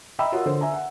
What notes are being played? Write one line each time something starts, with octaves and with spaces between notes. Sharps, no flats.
D#5 E5 G5 A#5 B5 E6
F4 F#4 A#4 C#5 D#5 F#5
D3 C5
E5 G#5 A#5
F#5